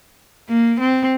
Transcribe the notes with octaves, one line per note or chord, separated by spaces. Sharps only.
A#3
C4